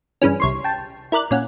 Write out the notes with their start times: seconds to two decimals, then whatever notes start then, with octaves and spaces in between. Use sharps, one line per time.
0.22 G2 C#3 E3 C#4
0.40 C2 C#5 C6
0.64 G5 A5
1.12 E4 A#4 D5 F#6
1.31 A#2 C#4 F#5